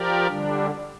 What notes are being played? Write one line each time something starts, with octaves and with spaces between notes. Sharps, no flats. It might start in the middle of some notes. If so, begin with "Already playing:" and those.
Already playing: F3 G4 A#4 D5
D3 G3 D4